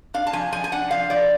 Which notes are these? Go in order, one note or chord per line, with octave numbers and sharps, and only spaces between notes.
D4 F5
A5
F3 G#5
F3 G#5
G#5
D4 F#5
F3 F5
F3 D5